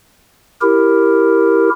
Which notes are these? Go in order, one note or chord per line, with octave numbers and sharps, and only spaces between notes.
E4 G4 A#4